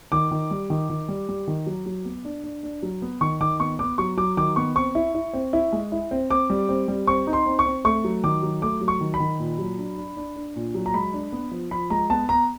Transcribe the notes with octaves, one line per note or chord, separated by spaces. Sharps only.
D#3 D6
D#3
G3
D#3
D#3
G3
G3
D#3
F#3
F#3
B3
D4
D4
D4
F#3
B3
D#3 C#6
D#3 D6
B3 C#6
B3 D6
F#3 C#6
F#3 D6
D#3 D6
B3 C#6
C4 C#6
E4
E4
C4
E4
G#3
E4
C4
C4 D6
G3
C4
G3
C4 C#6
D#4
C6
C4
C#6
C4
A3 C#6
F#3
D#3 D6
F#3
A3 D6
F#3
C#6
D#3
B5
D#3
A#2
F#3
D4
D4
D4
D4
A#2
F#3
A#5
G#3 B5
D4
B3
F3
F3 B5
G#3 A#5
B3 A5
B3 A#5